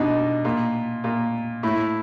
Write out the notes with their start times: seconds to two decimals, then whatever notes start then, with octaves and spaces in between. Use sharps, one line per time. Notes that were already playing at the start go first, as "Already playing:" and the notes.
Already playing: B2 D4 D#4
0.45 A#2
1.04 A#2
1.63 A2 E4